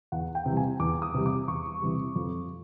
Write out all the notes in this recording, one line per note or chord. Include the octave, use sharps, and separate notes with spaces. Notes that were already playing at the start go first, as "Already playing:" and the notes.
E2 F#5
G5
C3 E3 G3
G#5
E2 D6
D#6
C3 E3 G3
D6
E2 C#6
C3 E3 G3
F2